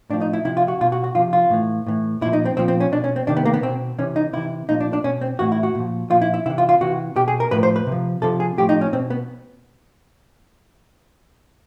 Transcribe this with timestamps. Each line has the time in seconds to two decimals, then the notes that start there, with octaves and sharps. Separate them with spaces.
0.10 A2 D4
0.13 F3
0.21 D#4
0.33 E4
0.45 C3 F3 E4
0.57 F4
0.68 F#4
0.81 B2 F4
0.92 F#4
1.04 F#4
1.15 C3 F3 F4
1.33 F4
1.50 A2 E3
1.87 A2 E3
2.21 A#2 E4
2.26 F3
2.33 D#4
2.45 C4
2.57 A#2 F3 C4
2.68 C4
2.80 C#4
2.92 B2 D4
3.04 C#4
3.16 C4
3.27 C3 D#3 D4
3.37 B3
3.45 A#3
3.54 B3
3.63 B2 C4
3.98 C3 E3 C#4
4.16 D#4
4.33 C3 E3 E4
4.69 A#2 F3 D#4
4.80 D4
4.93 D4
5.04 B2 C#4
5.21 C4
5.39 A2 E3 F#4
5.52 E4
5.63 F#4
5.75 A#2 F3
6.10 A#2 F3 F4
6.22 E4
6.34 E4
6.46 C3 E4
6.50 E3
6.58 F4
6.69 F4
6.81 C3 E3 F#4
7.16 B2 G4
7.28 G#4
7.40 A#4
7.51 A2 F3 B4
7.63 C5
7.76 B4
7.87 C3
7.92 F3
8.22 C3 F3 A4
8.40 G#4
8.58 A2 F3 G4
8.69 D#4
8.81 C#4
8.93 B2 C4
9.10 B3